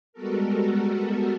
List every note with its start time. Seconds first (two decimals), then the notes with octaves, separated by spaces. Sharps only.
0.13 G3 G#3 B3 F#4 A4 A#4